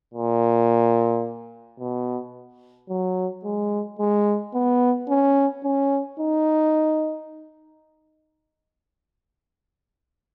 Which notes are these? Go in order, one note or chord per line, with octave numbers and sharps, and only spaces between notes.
A#2
B2
F#3
G#3
G#3
B3
C#4
C#4
D#4